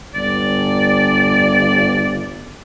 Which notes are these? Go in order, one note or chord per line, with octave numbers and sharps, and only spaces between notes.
G1 D5